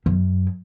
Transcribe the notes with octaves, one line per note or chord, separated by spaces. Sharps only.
F#2